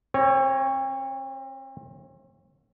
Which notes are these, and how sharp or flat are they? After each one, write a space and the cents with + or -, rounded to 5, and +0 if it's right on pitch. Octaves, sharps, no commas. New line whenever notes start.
C4 +40 C#5 +0